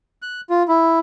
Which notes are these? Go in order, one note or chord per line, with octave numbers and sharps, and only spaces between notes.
F#6
F4
E4